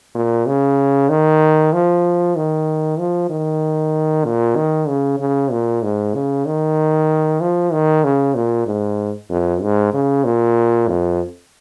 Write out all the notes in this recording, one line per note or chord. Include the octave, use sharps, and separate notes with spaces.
A#2
C#3
D#3
F3
D#3
F3
D#3
A#2
D#3
C#3
C#3
A#2
G#2
C#3
D#3
F3
D#3
C#3
A#2
G#2
F2
G#2
C#3
A#2
F2